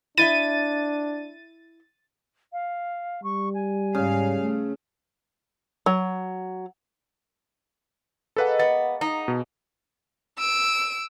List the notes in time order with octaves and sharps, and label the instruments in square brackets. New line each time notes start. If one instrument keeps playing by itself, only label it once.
[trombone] D4 [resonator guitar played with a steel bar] E4 D#5 E5 [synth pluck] A6 D#7
[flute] F5
[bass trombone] G3 [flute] C#6
[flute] G#5
[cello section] G#2 F5 [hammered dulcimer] C#3
[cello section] A3
[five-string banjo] F#3
[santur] G#3 A#3 B5 [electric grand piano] A4 B4 F#5
[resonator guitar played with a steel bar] B3 [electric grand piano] A6
[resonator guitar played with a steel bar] D#4
[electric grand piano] B2
[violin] E6 D7